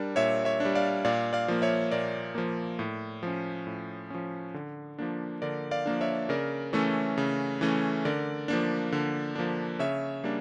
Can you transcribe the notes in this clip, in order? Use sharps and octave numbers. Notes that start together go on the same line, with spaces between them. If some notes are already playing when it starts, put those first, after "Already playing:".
Already playing: G3 D4 A#4
A#2 C#5 E5
C#5 E5
D4
G3
D5 F5
A#2 D5 F5
D5 F5
F3 A#3
C#5 E5
A#2 A#4 D5
F3 A#3
A2
F3 C#4
A2
F3 C#4
D3
F3 A#3 D4
D3 A#4 D5
D5 F5
F3 A#3 D4
C#5 E5
C#3 A#4 D5
E3 A3 C#4 A4 C#5
C#3
E3 A3 C#4
D3 A#4 D5
F3 A#3 D4
D3
F3 A#3 D4
C#3 C#5 E5
G3 A#3 D4